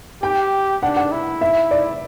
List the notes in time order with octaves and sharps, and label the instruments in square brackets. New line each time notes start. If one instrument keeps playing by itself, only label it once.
[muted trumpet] G4 [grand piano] G5
[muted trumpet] D4 [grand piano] F#5
[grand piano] F#5
[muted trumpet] E4
[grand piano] E5
D5